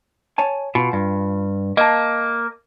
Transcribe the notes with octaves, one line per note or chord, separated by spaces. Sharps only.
C#5 G#5 A5
B2 F4
G2
A#3 D#5 A5